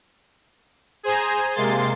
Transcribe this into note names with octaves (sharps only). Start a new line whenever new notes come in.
G#4 C5 G#5 A#5
C3 G#3 A#3 C6 A6